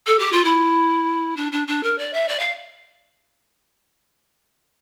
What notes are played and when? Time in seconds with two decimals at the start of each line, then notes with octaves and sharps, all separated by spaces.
0.06 A4
0.19 G4
0.32 F4
0.44 E4
1.36 D4
1.52 D4
1.67 D4
1.83 A#4
1.98 D5
2.13 E5
2.28 D5
2.39 F5